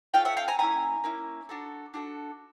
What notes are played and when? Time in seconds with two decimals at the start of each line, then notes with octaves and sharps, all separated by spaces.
0.14 C#4 F4 A4 F5 G5
0.25 E5 F#5
0.37 F5 G5
0.48 G#5 A#5
0.59 A#3 C#4 E4 G#5 A#5
1.04 A#3 C#4 E4
1.49 D4 F#4 A4
1.94 D4 F#4 A4